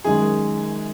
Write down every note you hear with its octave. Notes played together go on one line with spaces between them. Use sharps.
F#2 D#3 G#3 G#4